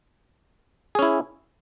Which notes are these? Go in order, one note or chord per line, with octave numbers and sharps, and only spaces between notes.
C#4 E4 G#4